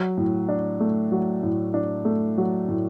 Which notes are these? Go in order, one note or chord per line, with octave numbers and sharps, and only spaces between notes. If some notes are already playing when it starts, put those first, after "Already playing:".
Already playing: F#3
A2
D4
A3
F#3
A2
D4
A3
F#3
A2